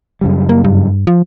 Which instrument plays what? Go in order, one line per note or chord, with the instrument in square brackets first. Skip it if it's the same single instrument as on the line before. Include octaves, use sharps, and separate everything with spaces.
[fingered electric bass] F#2 C#3 G3
[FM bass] A#3
G2
F3